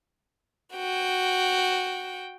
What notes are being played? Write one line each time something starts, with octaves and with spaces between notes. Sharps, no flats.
F#4 G5